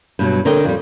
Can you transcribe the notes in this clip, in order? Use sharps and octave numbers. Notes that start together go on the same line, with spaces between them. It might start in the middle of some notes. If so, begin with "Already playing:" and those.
G2 B2 F#3
D3 A#4 C#5 D#5 G5
F2 G3